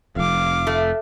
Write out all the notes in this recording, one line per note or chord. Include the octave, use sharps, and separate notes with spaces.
F1 F2 F5 D6
A3